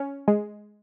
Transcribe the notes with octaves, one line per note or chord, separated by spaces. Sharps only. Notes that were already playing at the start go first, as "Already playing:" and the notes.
Already playing: C#4
G#3